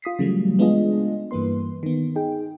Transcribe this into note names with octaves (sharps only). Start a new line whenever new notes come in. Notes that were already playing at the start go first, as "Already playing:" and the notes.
F4 D#6 B6 C7
C#3 E3 F#3 G3 A3
G#3 B3 D4 F4 G#4 D#5
G2 E3 A#3 B4 C6
D#3 B3
D#4 G#4 G5